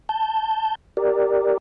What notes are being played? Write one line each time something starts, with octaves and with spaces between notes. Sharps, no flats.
A5 G6
G4 A#4 D5